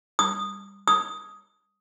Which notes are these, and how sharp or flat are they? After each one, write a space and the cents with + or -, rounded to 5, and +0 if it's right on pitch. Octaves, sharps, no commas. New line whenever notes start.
D#6 -10
D#6 +10